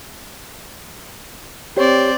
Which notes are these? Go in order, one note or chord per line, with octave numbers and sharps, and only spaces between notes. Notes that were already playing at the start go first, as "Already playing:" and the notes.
C4 G4 C#5 D5